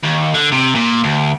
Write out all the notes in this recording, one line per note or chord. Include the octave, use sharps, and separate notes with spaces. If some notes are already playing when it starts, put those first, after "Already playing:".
D#2
D3
C3
A#2
D2